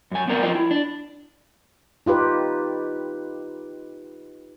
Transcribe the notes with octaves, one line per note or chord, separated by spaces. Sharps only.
F#2 G#5
B3 C4 A#4 C5 D5
F3 F4 D#5 G5
E4
D4
D#4 F4 G4 B4